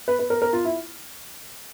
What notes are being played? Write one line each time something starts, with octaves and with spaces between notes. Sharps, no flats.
B4
B4
A#4
A#4
F4
E4